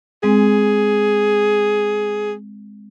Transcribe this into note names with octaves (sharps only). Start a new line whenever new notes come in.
G#3 C4 G#4